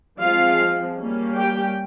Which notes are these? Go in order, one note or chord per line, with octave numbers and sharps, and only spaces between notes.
F3 G#3 C4 F4 F5
G3 A#3 C#4
G4 G5